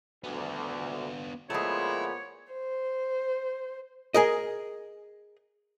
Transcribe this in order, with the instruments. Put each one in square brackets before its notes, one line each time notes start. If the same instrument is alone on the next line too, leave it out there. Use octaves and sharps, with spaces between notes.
[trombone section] D2 [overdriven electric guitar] B3 D4
[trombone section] A#2 F3 B3 [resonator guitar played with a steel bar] G#3 A3 [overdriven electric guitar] E4 [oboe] C#5
[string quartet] C5
[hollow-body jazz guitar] G#4 A#4 D#5